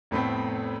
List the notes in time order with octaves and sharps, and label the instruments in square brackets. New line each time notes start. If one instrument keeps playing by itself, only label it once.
[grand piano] F1 A2 A3 B3 C4